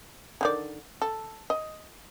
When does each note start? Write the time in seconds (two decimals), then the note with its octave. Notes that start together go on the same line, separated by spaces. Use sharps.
0.41 D3 D#3 D5
1.02 A4
1.50 D#5